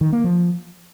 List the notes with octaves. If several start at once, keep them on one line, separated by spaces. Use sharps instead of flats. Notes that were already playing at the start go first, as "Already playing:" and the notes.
D#3
A#3
F3